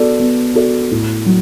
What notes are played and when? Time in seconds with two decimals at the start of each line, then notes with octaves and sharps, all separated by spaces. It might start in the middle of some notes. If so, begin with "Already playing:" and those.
Already playing: B3 F#4 A4 D5
0.20 B3
0.55 F#4 A4 D5
0.91 A2
1.26 F#3